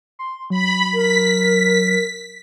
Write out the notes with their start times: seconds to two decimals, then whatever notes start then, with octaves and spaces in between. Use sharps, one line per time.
0.19 C6
0.50 F#3 B5
0.94 A#4 B6